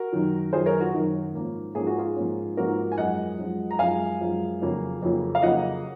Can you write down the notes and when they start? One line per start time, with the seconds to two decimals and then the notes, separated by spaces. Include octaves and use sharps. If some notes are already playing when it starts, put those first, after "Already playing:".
Already playing: F#4 A#4
0.12 F#2 D#3 F#3
0.53 F#2 D#3 F#3 G#4 C5
0.66 A#4 C#5
0.81 F#4
0.94 F#2 D#3 F#3
1.34 G#2 F3 A#3 C#4
1.75 G#2 F3 A#3 C#4 G#4
1.87 F#4
1.98 F4 G#4
2.16 G#2 F3 A#3 C#4
2.57 G#2 F3 A#3 C#4 F#4 A#4
2.92 G#5
2.98 F#2 F3 G#3 D#5 F#5
3.38 F#2 F3 G#3
3.71 A#5
3.79 F#2 F3 G#3 F5 G#5
4.21 F#2 F3 G#3
4.62 F2 C#3 F#3 A#3
5.02 F2 C#3 F#3 A#3
5.35 F5
5.42 F2 C#3 F#3 A#3 D#5 F#5